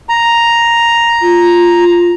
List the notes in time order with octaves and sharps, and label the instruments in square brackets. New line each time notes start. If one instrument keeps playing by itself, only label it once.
[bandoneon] A#5
[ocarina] F4